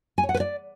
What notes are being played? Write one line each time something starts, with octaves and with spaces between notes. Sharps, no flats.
G#5
C#5
F#5
B4
D5